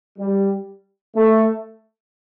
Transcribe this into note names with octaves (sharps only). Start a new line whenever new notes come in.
G3
A3